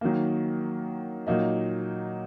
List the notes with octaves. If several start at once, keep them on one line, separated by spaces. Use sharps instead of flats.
D#3 F#3 A#3
A#2 F#3 A#3 D#4